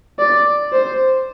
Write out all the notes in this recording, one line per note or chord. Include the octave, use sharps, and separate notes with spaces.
D5
C5